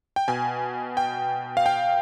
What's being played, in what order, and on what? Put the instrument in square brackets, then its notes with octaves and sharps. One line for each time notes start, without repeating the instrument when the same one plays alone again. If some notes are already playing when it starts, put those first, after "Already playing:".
[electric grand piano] G5
B2 G#5
G5
F5
G5